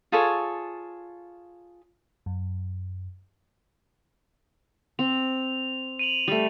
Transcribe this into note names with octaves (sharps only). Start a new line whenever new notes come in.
F4 G#4 A4 C#5
F#2
C4 F7
D#7 F7 F#7
G3 A3